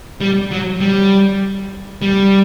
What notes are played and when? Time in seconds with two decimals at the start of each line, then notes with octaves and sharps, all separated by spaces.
0.21 G3
0.51 F#3
0.80 G3
2.02 G3